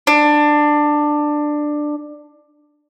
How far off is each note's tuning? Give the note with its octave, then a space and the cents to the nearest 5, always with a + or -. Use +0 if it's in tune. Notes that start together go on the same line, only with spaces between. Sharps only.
D4 +15